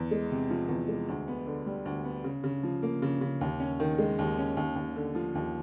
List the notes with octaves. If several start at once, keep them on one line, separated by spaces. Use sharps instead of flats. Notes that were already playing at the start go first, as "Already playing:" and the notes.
Already playing: E2
G#3
C3
F3
E2
G#3
D2
B3
D3
G3
D2
B3
C#3
C#3
F3
A#3
C#3
C#3
D#2
C#4
D#3
G#3
D#2
C#4
D#2
D#2
D3
F3
D#2